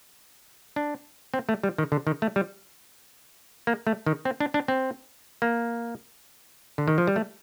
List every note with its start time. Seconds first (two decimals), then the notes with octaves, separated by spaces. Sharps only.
0.76 D4
1.34 C4
1.49 A3
1.63 G3
1.78 D#3
1.92 D3
2.07 D#3
2.22 A3
2.36 G3
3.67 A#3
3.87 A3
4.06 D#3
4.25 C4
4.40 D4
4.54 D4
4.68 C4
5.42 A#3
6.78 D3
6.88 D#3
6.98 F3
7.07 G3
7.16 A3